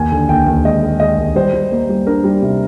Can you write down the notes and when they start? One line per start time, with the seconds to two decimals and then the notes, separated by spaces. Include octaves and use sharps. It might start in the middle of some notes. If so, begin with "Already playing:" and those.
Already playing: D#2 G#5
0.12 D3
0.29 D#2 G5
0.46 D#2
0.65 G#3 D#5
0.82 G#3
1.00 G#3 D#5
1.18 D#2
1.36 G3 C5
1.53 G3
1.72 A#3
1.89 G3
2.07 D4 A#4
2.24 G3
2.42 C3